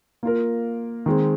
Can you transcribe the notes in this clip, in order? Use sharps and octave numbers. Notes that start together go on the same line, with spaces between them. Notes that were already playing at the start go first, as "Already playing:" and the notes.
A#3 F4 A#4
D#3 G#3 C4